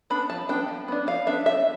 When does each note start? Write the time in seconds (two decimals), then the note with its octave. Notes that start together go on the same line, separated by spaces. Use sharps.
0.10 B3 D4 B5
0.30 F3 A5
0.49 B3 D4 G5
0.68 F3
0.88 B3 D4
1.07 F3 F5
1.26 B3 D4 E5
1.46 F3 E5